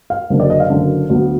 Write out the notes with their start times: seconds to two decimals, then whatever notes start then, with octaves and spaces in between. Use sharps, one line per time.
0.10 F5
0.30 F#1 F#2 D3
0.40 D5
0.50 D#5
0.60 F5
0.70 F#1 F#2 D3
1.10 D2 D3 F#3 B3